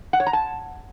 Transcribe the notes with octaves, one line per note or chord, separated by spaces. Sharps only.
F#5
C#5
A#5
A5